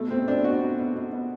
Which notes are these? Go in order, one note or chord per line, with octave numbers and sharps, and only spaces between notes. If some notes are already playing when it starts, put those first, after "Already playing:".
Already playing: B2 A3
B2 C4
B2 D4
B2 F#4
B2
B2
B2
B2